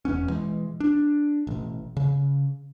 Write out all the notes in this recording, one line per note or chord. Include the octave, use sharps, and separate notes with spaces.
E1 E2 B3 C#4
B2 E3 G#3
D4
A1 B2
C#3